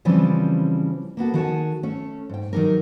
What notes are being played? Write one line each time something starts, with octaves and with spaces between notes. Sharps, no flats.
C#3 E3 F3 G3 C4 C#4
A#3 B3 F#4 A4
D#3 F#4 G#4 A5
A3 C#4
G#2 G5
D#3 F#3 D#4 G4 A#4